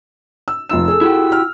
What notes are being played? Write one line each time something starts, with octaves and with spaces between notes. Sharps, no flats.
E6
F1 F4 E6 E7
G#4 A4
E4 F#4 G4
F6